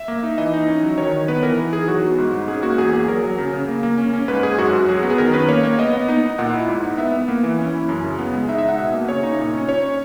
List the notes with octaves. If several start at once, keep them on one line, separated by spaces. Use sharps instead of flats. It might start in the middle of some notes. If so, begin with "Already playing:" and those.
Already playing: E5
A#3
D#4
E3 D#5
D#4
C#4
F#3
D#3 C#5
D#3
B3 B4
E3 A#4
E3
D#4 G#4
F#3 F#4
B3
G#2
G#2
C#4 G#4
A#3 F#4
E2 G#4
A#3 G#4
F#3 A#4
F#3
C#3
C#3
A#3
A#3
C#4
C#4
G#2 B4
G#2 G#4
F#2 F#4
F#2
F#3 G#4
B3
G#4
D#3 A#4
C#4 B4
A#3 C#5
A#3
B3 D#5
B3
D#4
D#4
A#2 F#5
E4
G#2
D#4
B3 E5
B3
A#3
E3
C#4
E4
F#2
C#3
B3
G#3
D#4 E5
D#4 E5
F#5
B2 E5
A#3
C#3 C#5
D#4
A#2
C#4
C#4 C#5